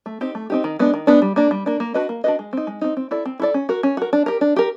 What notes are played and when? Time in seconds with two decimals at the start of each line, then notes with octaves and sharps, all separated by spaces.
0.06 A3
0.21 C4 D#4 G4
0.35 A3
0.50 C4 D#4 G4
0.64 D#3
0.79 G#3 B3 D4
0.93 D#3
1.07 G#3 B3 D4
1.22 G3
1.36 A#3 D4
1.51 G3
1.66 A#3 D4
1.80 A#3
1.94 D4 F#4 B4 D#5
2.09 A#3
2.24 D4 F#4 B4 D#5
2.39 G#3
2.53 C4 D#4
2.67 G#3
2.81 C4 D#4
2.97 C4
3.11 E4 A4 D5
3.25 C4
3.39 E4 A4 D5
3.54 C#4
3.69 F#4 A#4
3.83 C#4
3.97 F#4 A#4
4.13 D4
4.26 G4 A#4
4.41 D4
4.56 G4 A#4